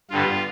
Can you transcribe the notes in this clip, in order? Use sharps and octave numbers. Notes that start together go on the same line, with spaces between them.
G2 D3 G3 B3 F4